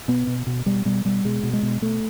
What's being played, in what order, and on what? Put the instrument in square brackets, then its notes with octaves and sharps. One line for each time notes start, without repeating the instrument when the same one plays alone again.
[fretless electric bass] B2 B3
B2
B2
B2 G3
B2 G3
B2 G3
B2 G#3
B2
G#3
B2
B2 A3